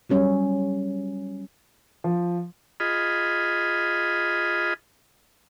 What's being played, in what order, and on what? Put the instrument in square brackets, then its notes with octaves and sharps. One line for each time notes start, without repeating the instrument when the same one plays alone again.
[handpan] F#3 G3 C#4 C#5
[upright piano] F3
[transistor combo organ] F4 G#4 D#5 B5